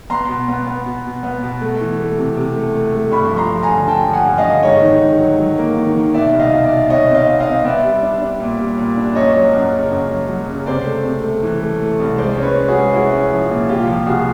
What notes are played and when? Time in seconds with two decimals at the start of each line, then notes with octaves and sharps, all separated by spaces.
0.10 B3 A#5 C6
0.29 B2
0.48 B3
0.67 B3
0.86 B2
1.05 B2
1.23 B3
1.43 B2
1.61 A3
1.81 E3
1.99 A3
2.17 C3
2.37 C3
2.56 A3
2.75 A3
2.94 A3
3.12 G2 B5 C#6
3.31 F3
3.37 A#5 C6
3.51 F3
3.63 G#5 A#5
3.70 D3
3.87 D3 G5 A5
4.07 F3
4.13 F#5 G#5
4.25 G2
4.38 D#5 F5
4.44 D3
4.63 G#2 C#5 D#5
4.82 D#3
5.01 G#2
5.19 F#3
5.38 F#3
5.58 A#3
5.77 D#3
5.95 D#3
6.14 B2 D5 E5
6.33 C2
6.39 D#5 F5
6.52 B2
6.64 D5 E5
6.71 B2
6.90 B2 C#5 D#5
7.08 C4
7.15 D#5 F5
7.28 B2
7.40 D#5 F5
7.46 C4
7.64 B3 D5 E5
7.83 G3
8.03 D4
8.22 D4
8.40 A#2
8.60 G3
8.78 A#2
8.97 D4
9.15 F#2 C#5 D#5
9.35 F#3
9.53 F#2
9.72 C#3
9.92 F#2
10.10 F#3
10.29 F#3
10.49 C#3
10.66 C3 C5 D5
10.85 A3
11.04 C3
11.23 A3
11.43 E3
11.61 A3
11.80 A3
12.00 C2
12.18 G#3 C5 D5
12.37 C#4
12.42 B4 C#5
12.55 C#4
12.68 F#4 G#4
12.75 G#3
12.93 G#3 E4 F#4
13.12 C#4
13.31 F3
13.50 A#2
13.69 C2 F4 G4
13.88 F3
14.06 C2 F#4 G#4